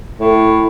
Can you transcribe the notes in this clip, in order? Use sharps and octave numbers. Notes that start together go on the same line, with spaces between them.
A2